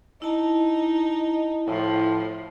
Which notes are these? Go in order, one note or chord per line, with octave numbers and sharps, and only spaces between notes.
D#4 E4 A5
A2 F3